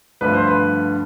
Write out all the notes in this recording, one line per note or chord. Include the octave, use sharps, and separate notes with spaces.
G2 D3 F3 A3 B4
C5
B4